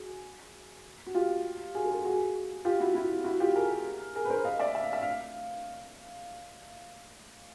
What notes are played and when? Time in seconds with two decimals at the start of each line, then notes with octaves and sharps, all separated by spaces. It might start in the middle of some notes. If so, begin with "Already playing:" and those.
Already playing: F#4 G#4
1.07 F#4
1.15 F4 G4
1.75 F#4 G#4
1.85 A4
1.89 G#4 A#4
2.05 F#4 G#4
2.65 F4 G4
2.80 E4 F#4
2.94 E4 F#4
3.24 E4 F#4
3.40 F4 G4
3.55 G#4 A#4
4.15 G#4 A#4
4.25 B4
4.30 A#4 C5
4.45 D#5 F5
4.59 D5 E5
4.75 E5
4.84 F5
4.93 E5
5.02 F5